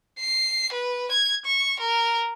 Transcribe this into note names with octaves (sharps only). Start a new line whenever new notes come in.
C7
B4
G#6
C#6
A#4